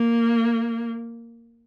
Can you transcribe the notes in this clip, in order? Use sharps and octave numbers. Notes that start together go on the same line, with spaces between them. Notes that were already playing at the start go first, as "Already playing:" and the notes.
Already playing: A#3